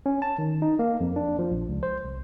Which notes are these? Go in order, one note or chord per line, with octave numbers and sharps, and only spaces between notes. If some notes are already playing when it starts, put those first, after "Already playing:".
C#4
A5
D#3
D#4
A#3
F2
D4
F3
A#1
C#2
C5
C2